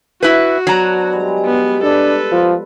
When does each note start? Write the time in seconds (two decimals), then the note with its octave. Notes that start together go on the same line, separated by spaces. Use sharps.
0.23 E4 F#4 B4
0.67 F#3 B3 D4 C5 A#5
1.13 G3 G#3
1.46 B3
1.83 D4 A4 B4
2.32 F3